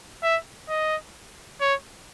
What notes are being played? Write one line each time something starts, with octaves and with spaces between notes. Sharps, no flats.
E5
D#5
C#5